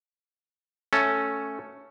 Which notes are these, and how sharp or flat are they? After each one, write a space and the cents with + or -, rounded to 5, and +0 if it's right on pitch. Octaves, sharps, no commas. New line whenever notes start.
A3 +0 C#4 +0 A4 +0